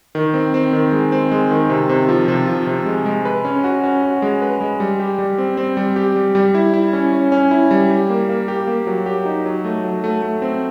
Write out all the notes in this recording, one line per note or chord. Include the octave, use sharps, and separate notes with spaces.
D#3
C4
C4
D#3
G#3
C4
G#3
D#3
C3
C3
F3
C3
F3
C3
G#3
G#3
B4
C#4
F#4
C#4
F#4
G#3
B4
G#3
G3
G4
G3
C4
C4
G3
G4
G3
G3
E4
E4
C#4
C#4
C#4
E4
G3
G4
A#3
A#3
G4
A#3
F#3
G4
D#4
F#3
A3
F#3
A3
A3
C4